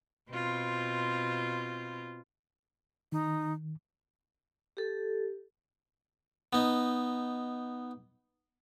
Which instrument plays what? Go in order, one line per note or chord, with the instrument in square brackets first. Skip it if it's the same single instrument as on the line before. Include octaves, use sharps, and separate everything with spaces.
[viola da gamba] B2 C4 F4
[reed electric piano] D#3 [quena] D#4
[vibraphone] G4 A4
[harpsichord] B3 D#4